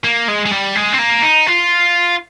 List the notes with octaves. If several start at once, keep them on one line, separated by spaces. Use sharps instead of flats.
A#3
G#3
G#3
G3
G#3
C4
A#3
D#4
F4